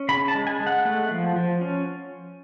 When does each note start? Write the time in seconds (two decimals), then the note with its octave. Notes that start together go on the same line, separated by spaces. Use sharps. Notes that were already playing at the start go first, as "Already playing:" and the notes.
Already playing: C#4
0.09 C#3 B5
0.28 A5
0.35 G#3
0.47 G#5
0.60 G#3
0.67 F#5
0.85 A3
1.11 F3
1.36 F3
1.61 C#4